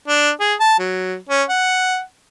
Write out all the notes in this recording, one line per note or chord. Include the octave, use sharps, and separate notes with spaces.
D4
G#4
A5
F#3
C#4
F#5